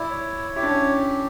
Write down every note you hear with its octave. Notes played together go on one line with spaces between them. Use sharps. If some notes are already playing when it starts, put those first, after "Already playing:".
Already playing: E4 D5 E5
C#5
E4 G4
D4
C#4